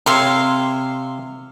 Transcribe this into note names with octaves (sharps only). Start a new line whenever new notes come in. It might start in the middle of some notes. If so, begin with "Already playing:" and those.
C3 C#5 E5 F5 C6